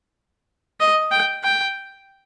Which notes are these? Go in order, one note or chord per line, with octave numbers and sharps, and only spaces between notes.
D#5
G5
G5